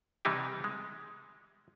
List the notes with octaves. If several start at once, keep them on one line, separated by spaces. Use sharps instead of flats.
C3 E3 G3 D#4 E4 G4
G#3